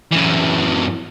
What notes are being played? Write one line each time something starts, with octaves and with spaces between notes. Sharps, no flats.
F#2 E3